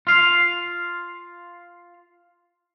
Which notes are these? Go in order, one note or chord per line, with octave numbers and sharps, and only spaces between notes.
F4 F5